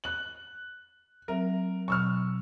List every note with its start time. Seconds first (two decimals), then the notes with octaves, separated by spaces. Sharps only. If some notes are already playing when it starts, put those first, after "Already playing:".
0.04 F#6 F#7
1.28 F#3 C4 A#4 E5
1.88 B2 F#3 C#6 E6 F6